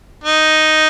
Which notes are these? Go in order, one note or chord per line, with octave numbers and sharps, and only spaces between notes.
D#4